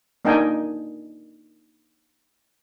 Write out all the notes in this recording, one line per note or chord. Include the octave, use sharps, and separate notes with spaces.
A#3 D4 D#4 D#5 G5 G#5